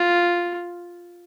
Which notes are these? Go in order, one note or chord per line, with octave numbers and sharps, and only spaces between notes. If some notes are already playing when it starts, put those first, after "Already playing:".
Already playing: F4